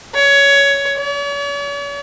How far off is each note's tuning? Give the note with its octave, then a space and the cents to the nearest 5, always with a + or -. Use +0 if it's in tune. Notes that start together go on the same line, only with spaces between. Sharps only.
C#5 +15
C#5 +45